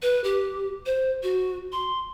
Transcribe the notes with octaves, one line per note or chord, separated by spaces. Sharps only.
B4
G4
C5
F#4
C6